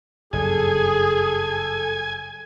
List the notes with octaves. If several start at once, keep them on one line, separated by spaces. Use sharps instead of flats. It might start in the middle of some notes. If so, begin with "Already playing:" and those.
F#1 G2 G#4 A4 G#5